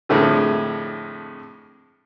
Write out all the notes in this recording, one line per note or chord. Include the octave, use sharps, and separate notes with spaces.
F2 A2 D3 G#3